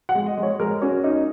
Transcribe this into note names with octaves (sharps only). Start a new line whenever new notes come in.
F#5
G#3
D#5
G#3
C#5
G#3 A#4
C#4 F#4
C#4 D#4